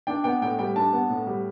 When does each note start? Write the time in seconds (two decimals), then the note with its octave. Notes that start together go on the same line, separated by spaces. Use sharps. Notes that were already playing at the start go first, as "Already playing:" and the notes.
0.07 D4 G5
0.24 B3 G5
0.41 A2 G5
0.59 G3 G5
0.76 D4 A5
0.93 B3
1.09 A2
1.27 G3